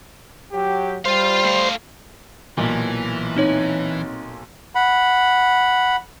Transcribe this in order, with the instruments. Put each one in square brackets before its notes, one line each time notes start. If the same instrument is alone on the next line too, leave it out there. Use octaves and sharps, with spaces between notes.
[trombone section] F#3 G4
[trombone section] G3 [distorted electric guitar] F4 F5 [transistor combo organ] C5
[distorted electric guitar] A3 F5
[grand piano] B1 A#2 [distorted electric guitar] E3
[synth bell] C4 D#4 C#5
[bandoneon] F#5 B5